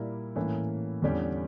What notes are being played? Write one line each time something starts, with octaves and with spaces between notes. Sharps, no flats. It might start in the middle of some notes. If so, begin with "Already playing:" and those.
Already playing: A#2 G3 A#3 E4
A2 E3 A#3 C#4
E2 D3 G3 C#4 G4